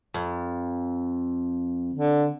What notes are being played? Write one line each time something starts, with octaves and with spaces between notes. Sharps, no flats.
F2
D3